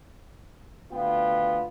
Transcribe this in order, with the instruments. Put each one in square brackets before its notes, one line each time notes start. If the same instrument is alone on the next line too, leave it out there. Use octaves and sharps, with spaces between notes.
[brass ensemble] D2 B3 F4 G5